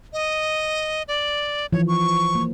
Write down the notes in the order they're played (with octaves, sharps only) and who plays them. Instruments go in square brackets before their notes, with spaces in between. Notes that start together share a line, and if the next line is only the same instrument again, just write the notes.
[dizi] D#5
D5
[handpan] E3 F3 [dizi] C#5
[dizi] C#6
[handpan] A#3